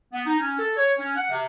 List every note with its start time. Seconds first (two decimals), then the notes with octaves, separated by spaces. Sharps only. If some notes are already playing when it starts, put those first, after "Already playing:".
0.13 B3
0.26 D#4
0.40 C#4
0.59 A4
0.77 C#5
0.99 C#4
1.16 F#5
1.30 C3